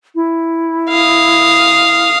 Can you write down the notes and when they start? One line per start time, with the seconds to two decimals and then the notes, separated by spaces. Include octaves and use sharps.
0.15 E4
0.90 F5 D#6